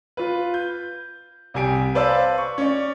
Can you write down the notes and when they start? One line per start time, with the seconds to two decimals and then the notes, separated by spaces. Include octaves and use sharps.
0.17 F4 B4
0.54 G6
1.54 C2 G4 G#5 D7
1.95 B4 C5 D5 F5 A5 E6
2.38 C#6
2.58 C#4 D5